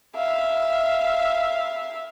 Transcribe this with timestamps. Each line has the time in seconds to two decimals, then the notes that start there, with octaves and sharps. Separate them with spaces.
0.15 E5 F5